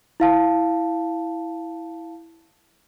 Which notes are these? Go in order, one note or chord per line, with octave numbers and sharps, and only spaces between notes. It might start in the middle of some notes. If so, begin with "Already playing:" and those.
E4 F5 A5